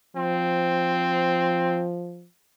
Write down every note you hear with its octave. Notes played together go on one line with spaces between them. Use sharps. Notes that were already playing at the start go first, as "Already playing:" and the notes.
F3 C4